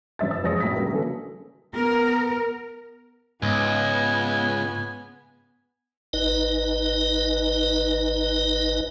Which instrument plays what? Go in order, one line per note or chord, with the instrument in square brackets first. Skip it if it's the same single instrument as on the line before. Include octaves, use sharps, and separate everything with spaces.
[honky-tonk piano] G#1 F#2 E5 A6
F#1 E6
F#1 F2 G#3 C#5 D#6 A#6
B1 A2 F#3 A#6 B6
C#3 G3 A#3
D3 E3 F#3 A#3 C#4 A4
[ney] B3 [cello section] A#4
[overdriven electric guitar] C#2 [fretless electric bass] G#2 [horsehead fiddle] B3 [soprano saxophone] G#5
[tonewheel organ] G#1 D#4 B4 D#5